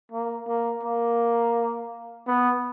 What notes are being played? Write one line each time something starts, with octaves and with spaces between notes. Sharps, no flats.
A#3
A#3
A#3
B3